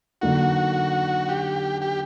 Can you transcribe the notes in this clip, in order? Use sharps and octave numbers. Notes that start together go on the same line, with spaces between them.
D3 F#3 A#3 D#4 F#4
G4
G4